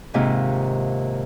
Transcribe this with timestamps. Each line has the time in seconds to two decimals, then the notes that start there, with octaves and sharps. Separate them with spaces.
0.14 D#2 G#2 C3 F4